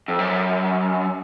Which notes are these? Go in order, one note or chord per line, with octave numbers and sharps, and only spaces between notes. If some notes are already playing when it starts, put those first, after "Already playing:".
F2
F#2